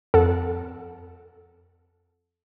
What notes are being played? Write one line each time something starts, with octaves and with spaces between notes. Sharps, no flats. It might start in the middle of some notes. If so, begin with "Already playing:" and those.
F2 A4 F#5